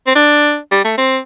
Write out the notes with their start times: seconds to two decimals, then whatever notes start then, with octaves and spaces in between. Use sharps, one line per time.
0.07 C4
0.15 D4
0.72 G3
0.85 A3
0.98 C4